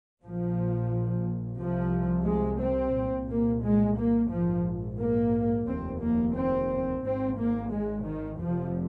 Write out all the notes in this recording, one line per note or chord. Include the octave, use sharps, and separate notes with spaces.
A#1 A#2 F3
C2 C3 F3
G#3
C4
C2 A#2
A#3
G#3
A#3
A#1 G#2 F3
A#3
F1 D#2 C4
A#3
C4
G#1 G#2 C4
A#3
G#3
D#3
F1 F2 C3 F3